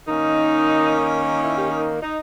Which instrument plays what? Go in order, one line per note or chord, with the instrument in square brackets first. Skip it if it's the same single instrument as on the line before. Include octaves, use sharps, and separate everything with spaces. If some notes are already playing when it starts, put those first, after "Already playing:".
[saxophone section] D#3 A#3 C#4 D#4
D#4
E4
G4
D#4
D#4